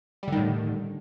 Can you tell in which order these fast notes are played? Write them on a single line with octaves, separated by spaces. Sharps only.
G3 D3 D#3 A2